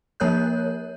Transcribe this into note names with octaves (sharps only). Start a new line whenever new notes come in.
F3 A#3 A#4 C#5 F#6 G6